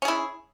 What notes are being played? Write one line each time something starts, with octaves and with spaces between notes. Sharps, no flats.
C#4 E4 G#4